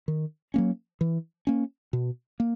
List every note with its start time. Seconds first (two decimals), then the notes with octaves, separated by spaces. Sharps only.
0.08 D#3
0.54 F#3 A#3 C#4
1.01 E3
1.47 A#3 C#4
1.93 B2
2.40 A#3